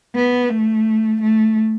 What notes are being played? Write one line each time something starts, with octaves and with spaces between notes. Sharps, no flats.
B3
A3
A3